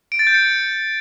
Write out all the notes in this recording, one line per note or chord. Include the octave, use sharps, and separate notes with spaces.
D7
A6
G6
C#7